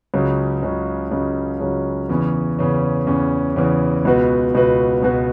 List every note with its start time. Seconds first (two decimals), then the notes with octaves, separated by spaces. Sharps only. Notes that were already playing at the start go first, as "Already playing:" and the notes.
0.14 C#2 C#3 F#3 C#4
0.63 C#2 C#3 F#3 C#4
1.11 C#2 C#3 F#3 C#4
1.60 C#2 C#3 F#3 C#4
2.09 E2 C#3 E3 C#4
2.59 E2 C#3 E3 C#4
3.07 E2 C#3 E3 C#4
3.56 E2 C#3 E3 C#4
4.05 C#2 B2 B3 F#4 B4
4.54 C#2 B2 B3 F#4 B4
5.02 C#2 B2 B3 F#4 B4